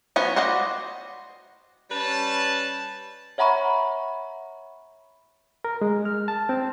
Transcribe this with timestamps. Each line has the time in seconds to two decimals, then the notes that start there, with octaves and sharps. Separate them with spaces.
0.16 F3 F#3 B3 C#4 F#4
0.36 F#4 C5 D5 D#5 F#5
1.90 G3 C#4 B4 A5
3.38 C#5 E5 F#5 A#5 B5 C#6
5.65 A#4
5.82 G#3
6.05 F6
6.28 A5
6.49 C4